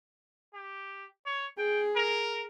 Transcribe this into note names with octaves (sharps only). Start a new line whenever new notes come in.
G4
C#5
G#4 G5
A#4